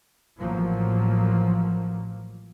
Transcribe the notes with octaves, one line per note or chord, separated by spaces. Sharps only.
A1 F3 F#3 A#3